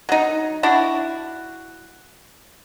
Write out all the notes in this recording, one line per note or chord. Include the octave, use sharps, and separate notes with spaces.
F#3 D#4
D4 E4 F#4